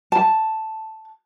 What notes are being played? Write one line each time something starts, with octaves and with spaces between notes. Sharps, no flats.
A5